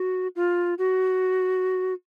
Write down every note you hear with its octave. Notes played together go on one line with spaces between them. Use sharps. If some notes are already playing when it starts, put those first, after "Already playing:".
Already playing: F#4
F4
F#4